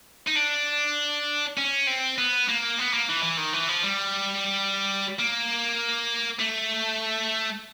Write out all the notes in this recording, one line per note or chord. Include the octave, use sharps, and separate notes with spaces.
D#4
D4
C#4
C4
B3
A#3
B3
A#3
E3
E3
D#3
E3
F3
G3
A#3
A3